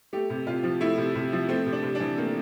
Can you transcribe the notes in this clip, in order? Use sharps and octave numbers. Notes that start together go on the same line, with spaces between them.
A3 G4
C3
C3 F4
F3
A3 E4
C3
C3
F3
A3 C4
C3
D4
C3
D4
E3
A3 A#3